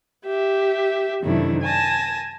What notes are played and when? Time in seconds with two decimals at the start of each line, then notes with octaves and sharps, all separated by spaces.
0.25 G4 E5
1.22 F#2 C3 D#3 A3 D4 E4
1.62 G#5 A5 A#6